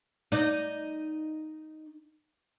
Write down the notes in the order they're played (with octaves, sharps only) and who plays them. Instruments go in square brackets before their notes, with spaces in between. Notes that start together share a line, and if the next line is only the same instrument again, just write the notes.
[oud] D#4 D5